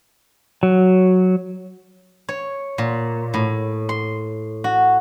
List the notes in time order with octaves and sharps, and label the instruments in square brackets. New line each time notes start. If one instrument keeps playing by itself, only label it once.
[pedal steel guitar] F#3
[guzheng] C#5
A#2
A2
C6
F#4